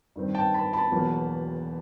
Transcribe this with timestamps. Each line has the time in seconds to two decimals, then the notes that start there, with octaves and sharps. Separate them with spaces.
0.16 G2 D#3 G3 C4
0.35 G5 A5
0.54 A5 B5
0.73 A5 B5
0.91 E1 E2 B2 F#3 A#3